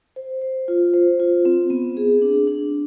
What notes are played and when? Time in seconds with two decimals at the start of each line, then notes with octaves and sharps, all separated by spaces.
0.16 C5
0.42 C5
0.68 F4
0.94 C5
1.20 F4
1.45 C4
1.70 B3
1.97 G#4
2.22 D4
2.47 D4